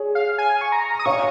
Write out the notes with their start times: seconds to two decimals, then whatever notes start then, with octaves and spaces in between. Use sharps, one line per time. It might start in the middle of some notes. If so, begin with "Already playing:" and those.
Already playing: G#4 C#5
0.15 F5
0.38 G#5
0.61 C#6
0.72 A#5
0.99 D#6
1.06 C#5 F5 C#6